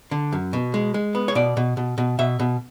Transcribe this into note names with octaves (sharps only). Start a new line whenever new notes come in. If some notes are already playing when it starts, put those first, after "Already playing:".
D3
F#2
B2
G#3
G#3
B3
C#5
B2 D5
B2
B2
B2
B2 E5
B2